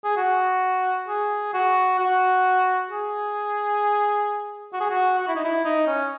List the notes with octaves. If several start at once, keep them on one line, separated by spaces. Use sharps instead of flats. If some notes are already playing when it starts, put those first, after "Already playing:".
G#4
F#4
G#4
F#4
F#4
G#4
F#4
G#4
F#4
F#4
E4
D#4
E4
D#4
C#4